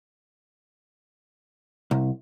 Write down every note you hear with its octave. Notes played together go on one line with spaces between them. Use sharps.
C2